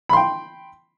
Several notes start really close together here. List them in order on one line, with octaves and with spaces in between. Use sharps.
B5 C6 G5